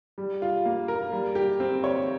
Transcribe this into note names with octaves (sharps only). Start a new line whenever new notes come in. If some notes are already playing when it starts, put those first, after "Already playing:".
G3
F4
A#3
A#4
G3
G4
C4
C#5